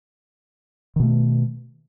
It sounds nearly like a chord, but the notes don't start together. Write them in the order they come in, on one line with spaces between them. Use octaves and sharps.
D#3 B2 A3